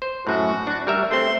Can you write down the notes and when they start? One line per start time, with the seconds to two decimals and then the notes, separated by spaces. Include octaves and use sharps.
0.02 C5
0.27 F#2 A2 F#4
0.67 D4
0.87 G3 A#4 E5
1.11 A3 C4 C6